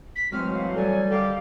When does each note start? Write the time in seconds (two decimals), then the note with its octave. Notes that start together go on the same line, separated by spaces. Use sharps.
0.16 B6
0.32 A2 E3 F#3 G#3 C4 F#4 F6
0.54 F5
0.76 G3 A4 G#5
1.11 D3 D#3 G4 A4 F5